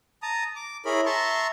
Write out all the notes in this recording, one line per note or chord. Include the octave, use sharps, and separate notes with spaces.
A5 A#5 D#6
D6
E4 G#4 A#4 C#5 B5
E5 A5 A#5 C6 C#6